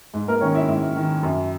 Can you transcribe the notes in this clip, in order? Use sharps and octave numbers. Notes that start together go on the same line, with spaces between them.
G#2
A#3 A#4
D#3 C#4 C#5
E4 E5
G#2 E4 E5
D#3
F#2